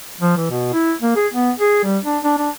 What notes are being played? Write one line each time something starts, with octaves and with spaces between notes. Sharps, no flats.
F3
E3
B2
E4
A#3
G#4
B3
G#4
G3
D4
D4
D4